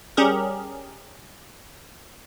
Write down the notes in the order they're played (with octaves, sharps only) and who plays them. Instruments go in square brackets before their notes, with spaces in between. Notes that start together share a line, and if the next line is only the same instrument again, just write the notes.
[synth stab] G3 C#4 G4 G#4 A#4